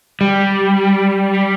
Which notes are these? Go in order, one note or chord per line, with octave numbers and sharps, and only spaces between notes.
G3